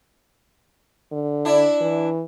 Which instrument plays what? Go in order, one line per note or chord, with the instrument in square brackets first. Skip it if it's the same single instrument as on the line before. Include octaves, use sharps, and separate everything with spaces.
[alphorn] D3
[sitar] D4 E4
[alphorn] E3